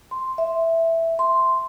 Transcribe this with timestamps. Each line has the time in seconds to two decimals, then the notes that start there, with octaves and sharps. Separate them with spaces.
0.11 C6
0.38 E5
1.19 C6